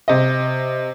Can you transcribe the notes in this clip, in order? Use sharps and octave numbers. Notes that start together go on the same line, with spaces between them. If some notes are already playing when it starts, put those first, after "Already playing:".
C3 D#5